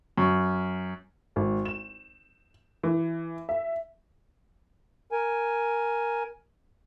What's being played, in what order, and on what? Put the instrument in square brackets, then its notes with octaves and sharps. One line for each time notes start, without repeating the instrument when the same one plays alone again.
[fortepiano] F#2
[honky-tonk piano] G#1
E7
E3
E5
[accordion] A#4 G#5